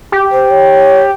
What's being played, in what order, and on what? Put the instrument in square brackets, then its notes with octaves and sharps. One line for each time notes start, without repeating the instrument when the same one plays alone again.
[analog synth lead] G4
[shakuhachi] C5
C#5